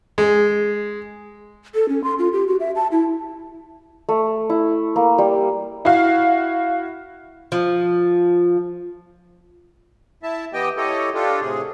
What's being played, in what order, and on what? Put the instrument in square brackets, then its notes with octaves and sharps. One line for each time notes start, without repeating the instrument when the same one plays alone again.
[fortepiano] G#3
[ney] A4
C#4
C6
F4
G4
F#4
E5
A5
E4
[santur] A3
E4
A#3
G3
[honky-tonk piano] E4 F#4 F5
[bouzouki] F3
[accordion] E4 E5 A5
E3 B3 G4 D#5 G5
E4 G4 A4 C#5 D#5
D4 F4 G4 A4
A2 C3 G#4